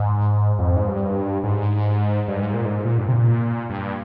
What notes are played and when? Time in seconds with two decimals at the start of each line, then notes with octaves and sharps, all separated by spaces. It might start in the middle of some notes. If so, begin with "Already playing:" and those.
Already playing: G#2
0.59 F2
0.76 G#2
0.87 G2
1.44 G#2
2.28 G2
2.42 G#2
2.54 A#2
2.65 G#2
2.85 A#2
2.98 G2
3.08 C3
3.12 A#2
3.69 G2